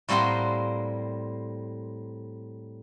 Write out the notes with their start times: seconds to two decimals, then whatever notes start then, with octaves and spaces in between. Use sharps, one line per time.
0.09 A2 G3 A#3 C4 F#5 C6